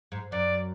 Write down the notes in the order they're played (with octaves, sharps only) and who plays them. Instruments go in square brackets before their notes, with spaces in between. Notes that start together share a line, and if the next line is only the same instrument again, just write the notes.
[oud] G#2
[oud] F#2 [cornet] D5